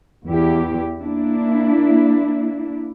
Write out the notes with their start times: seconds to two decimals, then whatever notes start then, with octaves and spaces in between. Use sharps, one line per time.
0.26 E2 E4 G4
1.00 A#3 D4 E4